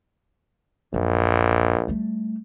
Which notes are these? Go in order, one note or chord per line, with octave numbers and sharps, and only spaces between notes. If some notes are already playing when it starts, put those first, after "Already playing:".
A#1 F#2
G3 A3